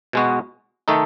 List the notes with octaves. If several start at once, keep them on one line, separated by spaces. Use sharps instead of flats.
B2 G#3 B3 F#4
D#3 A3 D#4 A4